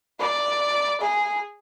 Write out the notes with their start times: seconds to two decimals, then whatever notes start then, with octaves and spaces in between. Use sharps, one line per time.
0.20 D5
1.01 G#4